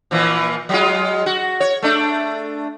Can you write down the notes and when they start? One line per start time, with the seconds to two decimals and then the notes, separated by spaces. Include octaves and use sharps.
0.11 A#2 E3 F3
0.69 F#3 G#3 F4
1.26 F#4
1.60 C#5
1.82 A3 D4